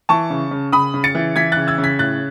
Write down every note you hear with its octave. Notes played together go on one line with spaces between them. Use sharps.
E3 A5 C#6
C#3
C#3
C#3 B5 D#6
C#3
A6 C#7
E3
E3 G#6 B6
C#3 F#6 A6
E6 G#6
C#3
G#6 B6
A2 F#6 A6